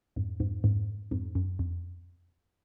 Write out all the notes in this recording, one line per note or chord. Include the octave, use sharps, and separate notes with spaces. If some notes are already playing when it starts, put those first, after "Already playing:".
F2 G#2
F2 G#2
F2 G#2
F2 G#2
F#2
F2